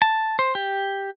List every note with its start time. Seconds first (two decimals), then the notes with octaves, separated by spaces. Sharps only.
0.02 A5
0.39 C5
0.55 G4